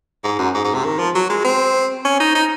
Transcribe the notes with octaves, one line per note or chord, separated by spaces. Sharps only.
G#2
F#2
G#2
G#2
C3
D#3
F3
F#3
G#3
C4
C#4
D#4
D#4